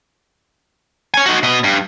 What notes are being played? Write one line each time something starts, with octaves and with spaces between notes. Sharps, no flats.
C#5 G#5
D#4 F#4
B2 D#5
G2